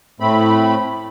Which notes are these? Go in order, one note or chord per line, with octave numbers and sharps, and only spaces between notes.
A2 A3 C4 B5